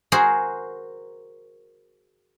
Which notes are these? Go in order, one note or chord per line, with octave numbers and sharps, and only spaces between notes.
F#4 G#4 A#4 C5 F#5